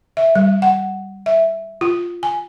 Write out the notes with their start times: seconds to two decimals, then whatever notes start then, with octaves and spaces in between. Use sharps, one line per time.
0.17 E5
0.35 G3
0.62 F#5
1.26 E5
1.81 F4
2.23 G#5